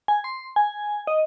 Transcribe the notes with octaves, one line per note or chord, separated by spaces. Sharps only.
G#5
C6
G#5
D#5